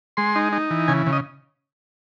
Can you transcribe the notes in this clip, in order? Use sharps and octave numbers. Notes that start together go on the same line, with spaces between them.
G#3 C6
D#4
D#4
E3
C#3 G#5
C#3
D#5